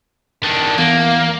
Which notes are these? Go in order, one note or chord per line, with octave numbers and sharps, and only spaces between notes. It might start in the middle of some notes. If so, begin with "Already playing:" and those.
D#3 D4
E2 A#3